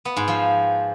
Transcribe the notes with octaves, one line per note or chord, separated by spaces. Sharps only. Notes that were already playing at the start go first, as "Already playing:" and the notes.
B3
G#2
F3